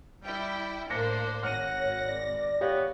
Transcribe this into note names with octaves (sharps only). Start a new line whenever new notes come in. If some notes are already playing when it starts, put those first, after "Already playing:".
G3 E4 G5
A2 A#3 D4 C5 A#6 C#7
G#1 C#5 F#5 F6 A#6 C#7 D#7
D5
B3 G4 C#5 F5